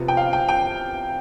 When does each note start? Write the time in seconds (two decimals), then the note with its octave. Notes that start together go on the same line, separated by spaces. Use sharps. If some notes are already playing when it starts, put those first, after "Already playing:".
Already playing: C3 F3 B3
0.08 G5
0.17 F5
0.33 G5
0.49 G5